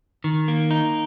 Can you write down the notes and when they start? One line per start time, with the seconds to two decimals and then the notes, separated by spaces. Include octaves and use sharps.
0.24 D#3
0.48 A#3
0.71 D#4